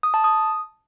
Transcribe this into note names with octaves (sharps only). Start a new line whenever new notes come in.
D#6
A5
D#6